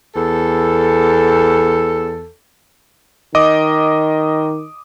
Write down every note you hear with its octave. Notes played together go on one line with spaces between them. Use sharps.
E2 A4
D#3 D#5 D6 D#6